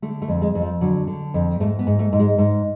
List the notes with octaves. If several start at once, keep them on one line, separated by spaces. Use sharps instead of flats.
D3 A3
A3
F2
G#3
F2
F3
D3 F#3
D3
F2
G#2 A3
B3
G#2
A3
G#2
G#3
G#2